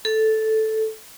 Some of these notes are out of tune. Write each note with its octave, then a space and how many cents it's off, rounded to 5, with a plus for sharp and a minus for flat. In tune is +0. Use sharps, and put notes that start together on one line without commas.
A4 -5